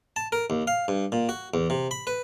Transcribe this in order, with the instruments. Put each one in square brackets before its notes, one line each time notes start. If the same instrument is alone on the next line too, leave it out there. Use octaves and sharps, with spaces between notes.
[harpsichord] A5
A#4
D#2
F5
G2
A#2
F#4
E2
C3
B5
B4